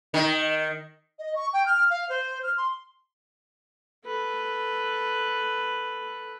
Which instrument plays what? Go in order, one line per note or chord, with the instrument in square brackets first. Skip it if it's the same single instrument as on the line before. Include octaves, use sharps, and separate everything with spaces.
[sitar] D#3
[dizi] D#5
C#6
G5
F6
F5
C5
F6
C6
[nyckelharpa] A4 B4